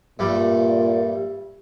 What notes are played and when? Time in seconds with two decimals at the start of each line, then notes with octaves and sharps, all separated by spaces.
0.19 G2 A#2 G3 A3